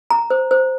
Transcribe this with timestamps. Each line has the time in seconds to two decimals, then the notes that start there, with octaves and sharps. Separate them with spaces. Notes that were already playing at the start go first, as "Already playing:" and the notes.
0.10 A#5
0.30 C5
0.51 C5